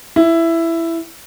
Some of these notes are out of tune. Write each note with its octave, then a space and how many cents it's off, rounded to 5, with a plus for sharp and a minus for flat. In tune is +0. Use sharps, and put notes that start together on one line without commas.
E4 +10